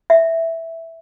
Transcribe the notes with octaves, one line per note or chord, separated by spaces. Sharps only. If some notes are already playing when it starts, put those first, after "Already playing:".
E5